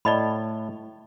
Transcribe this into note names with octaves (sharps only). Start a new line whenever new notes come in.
A2 D5 D#5 A5 B5